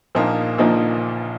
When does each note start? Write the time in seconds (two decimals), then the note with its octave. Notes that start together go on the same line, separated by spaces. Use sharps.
0.15 A#1 A#2 F3 A#3 D#4
0.58 A#1 A#2 F3 A#3 D#4